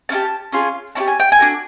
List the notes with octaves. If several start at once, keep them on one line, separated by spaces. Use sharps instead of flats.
C#4 E4 G4 A5
C#4 F4 G#4
C#4 E4 G4 A5
G#5
G5
G#5
D4 F#4 A4